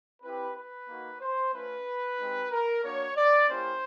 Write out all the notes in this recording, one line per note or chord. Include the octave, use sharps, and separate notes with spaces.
C4 E4 G4 B4
B4
A#3 D#4 F#4
C5
A3 C#4 F4 B4
G#3 C4 D#4 G4
A#4
A#3 D4 F#4 C#5
D5
A#3 C#4 E4 G4 C5